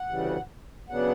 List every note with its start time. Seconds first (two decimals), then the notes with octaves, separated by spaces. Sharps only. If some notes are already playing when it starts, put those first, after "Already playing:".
Already playing: F#5
0.09 D2 C#3 E3 G3
0.89 C#3 F#3 B3 D4 F#5